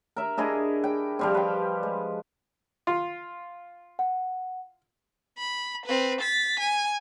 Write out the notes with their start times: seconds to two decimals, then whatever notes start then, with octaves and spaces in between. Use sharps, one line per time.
0.16 A#4 E5
0.37 D4 E4 G#4 D#5
0.84 G5
1.19 F3 G3 C4
1.34 B4 G5
1.83 G#3
2.87 F4
3.99 F#5
5.38 B5
5.86 C4 B4
6.21 A6 B6
6.60 G#5